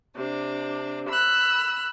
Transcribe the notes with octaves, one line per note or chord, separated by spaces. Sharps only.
C3 D4
B5 E6 F#6